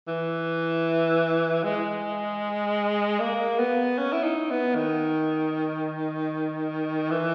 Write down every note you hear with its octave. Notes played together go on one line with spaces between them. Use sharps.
E3
G#3
A#3
B3
C#4
E4
D#4
B3
D#3
E3